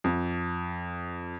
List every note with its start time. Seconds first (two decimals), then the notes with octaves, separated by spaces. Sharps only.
0.04 F2